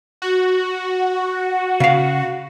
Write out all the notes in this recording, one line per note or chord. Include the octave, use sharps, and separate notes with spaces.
F#4
C#3 F5